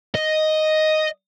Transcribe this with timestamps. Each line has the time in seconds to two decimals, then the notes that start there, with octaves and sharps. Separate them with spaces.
0.14 D#5